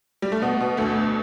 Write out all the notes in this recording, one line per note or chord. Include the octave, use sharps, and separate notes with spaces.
G3
A3
B2 B3
B2
D2 A3
D2